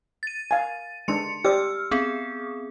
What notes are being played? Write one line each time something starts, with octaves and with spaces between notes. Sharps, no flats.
A6 D#7
F5 G#5
G#3 D4 C6 C#7
G4 C5 D5 E6 F6
B3 C4 G#4